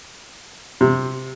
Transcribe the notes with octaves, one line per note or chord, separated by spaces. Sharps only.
C3